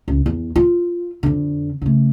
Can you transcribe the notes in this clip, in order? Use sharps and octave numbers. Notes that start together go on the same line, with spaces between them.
C#2
E2
F4
F2 D3
C#3 A3